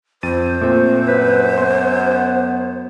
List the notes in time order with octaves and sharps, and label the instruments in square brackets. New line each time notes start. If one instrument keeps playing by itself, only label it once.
[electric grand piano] F2 A6 D#7 [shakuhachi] C5
[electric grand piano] A#2 C4 [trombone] A3
[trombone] F#2 [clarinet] B4
[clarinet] B3 [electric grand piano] C6